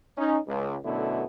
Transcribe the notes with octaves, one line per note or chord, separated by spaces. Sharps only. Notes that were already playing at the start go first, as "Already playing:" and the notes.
C#4 D#4
C#2
F#2 B2 D3 A3 B3 E4